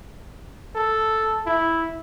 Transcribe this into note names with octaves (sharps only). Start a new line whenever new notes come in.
A4
E4